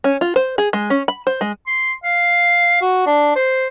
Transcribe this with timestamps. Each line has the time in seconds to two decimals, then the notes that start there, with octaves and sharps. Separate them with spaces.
0.04 C#4
0.21 F4
0.36 C5
0.58 G#4
0.73 G#3
0.90 C#4
1.08 B5
1.27 C5
1.41 G#3
1.67 C6
2.04 F5
2.81 F#4
3.06 D4
3.36 C5